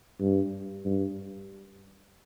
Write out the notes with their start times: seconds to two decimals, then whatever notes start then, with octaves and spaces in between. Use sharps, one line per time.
0.20 G2
0.85 G2